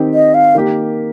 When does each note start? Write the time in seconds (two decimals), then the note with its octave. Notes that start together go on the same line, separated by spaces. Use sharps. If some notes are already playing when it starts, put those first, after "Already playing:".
Already playing: D#3 C4 D#4 G4
0.14 D#5
0.34 F5
0.55 D#3 A#3 G4